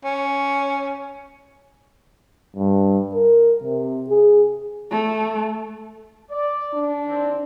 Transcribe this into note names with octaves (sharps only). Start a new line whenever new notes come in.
C#4
G2
A#4
C3
G#4
A3
D5
D4
C3 D#3 C4